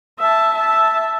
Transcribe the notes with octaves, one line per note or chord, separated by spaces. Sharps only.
E5 A5
E5 A5